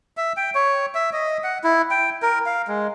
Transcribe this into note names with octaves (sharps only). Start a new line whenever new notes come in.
E5
G5
C#5
E5
D#5
F#5
E4
G5
A#4
F5
G#3